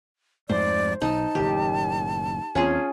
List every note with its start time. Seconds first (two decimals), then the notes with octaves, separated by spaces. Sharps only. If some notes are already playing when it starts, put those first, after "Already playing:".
0.49 F2 G#2 A3 C5 D5
1.02 B1 D#4 A5
1.35 F#1 A2 D#3 G4
2.55 D#2 C4 C#4 F4 G#4